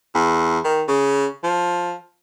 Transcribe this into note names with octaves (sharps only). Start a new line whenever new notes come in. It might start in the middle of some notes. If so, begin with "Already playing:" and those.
E2
D#3
C#3
F3